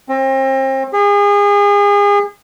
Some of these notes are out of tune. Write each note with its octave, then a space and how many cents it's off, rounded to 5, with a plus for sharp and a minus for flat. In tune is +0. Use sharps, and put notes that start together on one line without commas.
C4 +35
G#4 -35